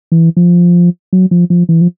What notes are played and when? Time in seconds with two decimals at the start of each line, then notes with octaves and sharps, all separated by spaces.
0.12 E3
0.37 F3
1.13 F#3
1.31 F3
1.50 F3
1.69 E3
1.81 F3